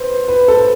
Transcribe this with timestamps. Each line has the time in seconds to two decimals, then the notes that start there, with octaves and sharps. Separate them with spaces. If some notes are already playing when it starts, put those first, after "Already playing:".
Already playing: B4 C5
0.28 B4
0.48 A4